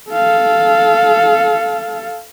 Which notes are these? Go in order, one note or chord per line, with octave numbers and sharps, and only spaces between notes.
A4 F5